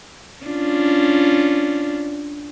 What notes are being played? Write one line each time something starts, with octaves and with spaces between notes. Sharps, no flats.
C#4 D4 F4